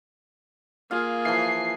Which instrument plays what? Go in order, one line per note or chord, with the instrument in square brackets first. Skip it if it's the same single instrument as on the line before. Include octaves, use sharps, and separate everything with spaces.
[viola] A#3 G#4 [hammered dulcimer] F4 F5
[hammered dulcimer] E3 F3 [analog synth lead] C7